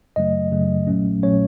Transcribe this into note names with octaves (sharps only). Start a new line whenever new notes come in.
F#2 C#3 F#3 A3 D#5
F#2 C#3 F#3 A3
A#1 A#2 F#3 A3 C#4
A#2 F#3 A3 C#4 C#5